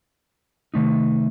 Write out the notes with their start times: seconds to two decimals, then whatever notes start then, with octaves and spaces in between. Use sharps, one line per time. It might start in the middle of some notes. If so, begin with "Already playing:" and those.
0.74 C3 D#3 A3 D#4